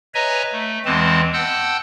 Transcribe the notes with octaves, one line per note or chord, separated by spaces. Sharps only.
B4 C#5 D#5 E5 G#5 A#5
A3
E2 E3 G#3 C4 A5
F#5 G5 A5 E6 F#6 G6